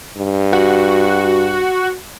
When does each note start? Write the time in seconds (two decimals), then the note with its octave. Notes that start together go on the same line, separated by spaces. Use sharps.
0.18 G2
0.53 F#4